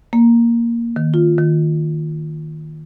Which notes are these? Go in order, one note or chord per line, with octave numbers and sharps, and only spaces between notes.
A#3
D#3
F4
D#3